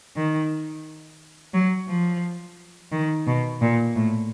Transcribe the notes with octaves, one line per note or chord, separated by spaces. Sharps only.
D#3
F#3
F3
D#3
B2
A#2
A2